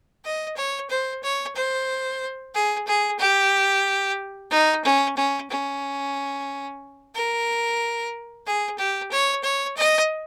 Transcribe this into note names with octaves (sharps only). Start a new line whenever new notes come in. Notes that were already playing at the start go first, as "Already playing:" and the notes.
D#5
C#5
C5
C#5
C5
G#4
G#4
G4
D#4
C#4
C#4
C#4
A#4
G#4
G4
C#5
C#5
D#5